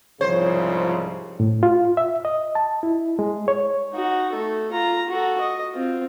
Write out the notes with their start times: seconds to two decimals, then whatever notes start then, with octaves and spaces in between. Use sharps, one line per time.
0.21 C2 G#2 C#3 F3 C5 C#5
1.40 A2
1.63 F4
1.97 E5
2.25 D#5
2.55 A5
2.83 E4
3.19 G#3
3.48 C#5
3.94 D#4 F#4
4.33 A3 A4
4.72 F4 A#5
5.09 F#4 A4
5.41 D#5
5.74 C4 F4